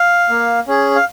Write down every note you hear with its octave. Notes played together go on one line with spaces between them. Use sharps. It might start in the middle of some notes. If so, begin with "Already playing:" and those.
Already playing: F5
A#3
C#4 G#4
F5